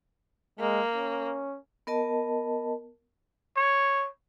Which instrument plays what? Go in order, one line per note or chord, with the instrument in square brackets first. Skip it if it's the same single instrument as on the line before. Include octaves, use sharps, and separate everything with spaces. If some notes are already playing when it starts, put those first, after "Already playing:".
[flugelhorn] G#3 [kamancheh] A#3
[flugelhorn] C#4
[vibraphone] B3 A#4 D#5 A5
[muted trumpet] C#5